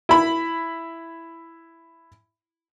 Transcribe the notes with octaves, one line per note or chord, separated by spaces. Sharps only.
E4 B5